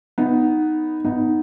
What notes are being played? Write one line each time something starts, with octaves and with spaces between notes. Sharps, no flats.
B3 D#4
B3 D#4